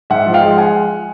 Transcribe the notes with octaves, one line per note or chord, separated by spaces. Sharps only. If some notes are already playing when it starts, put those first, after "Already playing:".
G#2 E5 F#5
F3
F5 G5
G#3
F#5 G#5